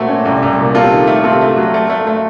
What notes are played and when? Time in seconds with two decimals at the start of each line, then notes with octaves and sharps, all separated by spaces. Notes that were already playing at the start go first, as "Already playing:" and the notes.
Already playing: A#2 A3 C4 F#4
0.09 C#4
0.25 C2
0.43 C2
0.59 A#2
0.74 C3 F4 A4
0.92 D#3
1.07 A3
1.24 C3 F4 A4
1.41 A3
1.57 F#3
1.74 A3
1.90 A3
2.07 A3